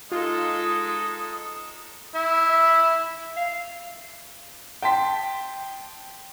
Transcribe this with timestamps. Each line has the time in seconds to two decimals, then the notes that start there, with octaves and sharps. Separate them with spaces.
0.12 G#3 D#4 F4 A4 D#6
2.14 E4 E5
2.49 E5
3.37 F5
4.82 G5 A5 C6 B6